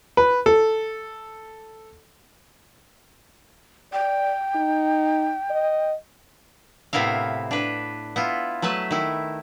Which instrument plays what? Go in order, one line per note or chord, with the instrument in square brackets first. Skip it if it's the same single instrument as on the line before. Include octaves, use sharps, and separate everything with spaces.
[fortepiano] B4
A4
[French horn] D5 [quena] G5
[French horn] D#4
D#5
[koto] A2 C3 B3 E4 A#4 F5
D4 B4
B3 E4 F4
F#3 A3 B4 A5
D#3 E4